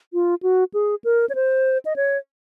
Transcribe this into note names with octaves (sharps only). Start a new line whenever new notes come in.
F4
F#4
G#4
A#4
C#5
C5
D#5
C#5